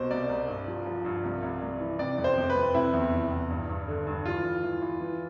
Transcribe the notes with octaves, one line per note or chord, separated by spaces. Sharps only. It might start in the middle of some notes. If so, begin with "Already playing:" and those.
Already playing: C2 B2 C5
C2 D5
C2
G2
F3
F3
G2
C2
C2
C2
E3
C3 D5
F2
C5
F2
B4
F2
C3 E4
E2
E3
E2
G2
G2
D3
G2
E3 F4
E3
E3
E3
E3